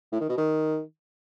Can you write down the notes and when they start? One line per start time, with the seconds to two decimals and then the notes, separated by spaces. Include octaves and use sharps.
0.12 A2
0.21 D#3
0.29 B2
0.37 D#3